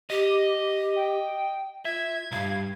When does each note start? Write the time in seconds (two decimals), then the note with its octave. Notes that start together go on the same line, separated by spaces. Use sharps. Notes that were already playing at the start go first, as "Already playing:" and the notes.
0.10 G4 D#5
0.96 G5
1.85 F4 E5 G#6
2.32 B1 G2 F5